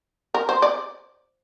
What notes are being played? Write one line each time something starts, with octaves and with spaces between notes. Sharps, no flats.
A#4
C5
D5